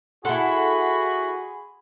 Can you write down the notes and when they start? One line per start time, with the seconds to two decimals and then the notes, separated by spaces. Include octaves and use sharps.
0.25 E4 F#4 G#4 A4 F#5 B5 C6